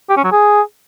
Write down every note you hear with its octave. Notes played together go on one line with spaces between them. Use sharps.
G4
C#4
F#3
G#4